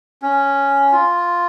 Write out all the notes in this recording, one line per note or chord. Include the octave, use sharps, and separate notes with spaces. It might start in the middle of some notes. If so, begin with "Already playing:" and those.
C#4
F4